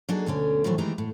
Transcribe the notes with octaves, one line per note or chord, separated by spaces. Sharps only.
F#3 A#3 D4 D#4 G#4 A4
D2 B2 D3 C#4
A2 D#3 E3 F#3 A3 C4
D#3 E3 G#3 A3 G4 A#5
A2